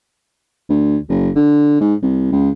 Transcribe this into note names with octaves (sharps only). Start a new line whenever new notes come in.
D2
F#1
D3
G#2
C2
C#2